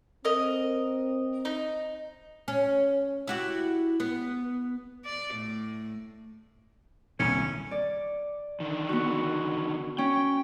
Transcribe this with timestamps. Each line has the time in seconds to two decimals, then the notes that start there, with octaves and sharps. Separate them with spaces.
0.25 C4 A#4 D#5
1.45 D#4
2.48 C#4
3.27 E4 F#4 G4
4.00 B3
5.05 D5
5.35 A2
7.19 D#1 C2 D3 C#4
7.71 D5
8.60 D3 D#3
8.89 B3 F#4
9.98 C#4 G5